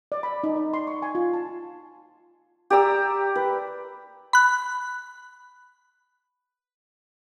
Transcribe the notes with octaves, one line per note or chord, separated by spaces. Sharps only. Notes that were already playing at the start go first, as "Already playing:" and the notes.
D5
B5
D#4
D5
C6
C#6
G#5
F4
A5
G4 D5 A#5 E6
B4
B5 F#6